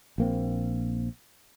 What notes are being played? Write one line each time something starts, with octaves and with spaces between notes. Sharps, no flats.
A#1 A#3 C4